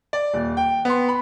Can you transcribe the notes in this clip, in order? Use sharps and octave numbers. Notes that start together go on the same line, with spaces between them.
D5
D#1
G5
B3 C6
B5